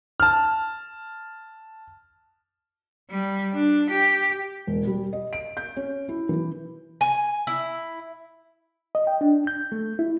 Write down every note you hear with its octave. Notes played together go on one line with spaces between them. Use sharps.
A5 F6
G3
D4
G4
E1
G3
D#5
D7
G6
C#4
E4
E3
G#5
E4
D#5
G5
D4
G6
A3
E4